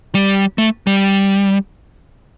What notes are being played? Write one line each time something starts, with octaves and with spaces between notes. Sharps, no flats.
G3
A3
G3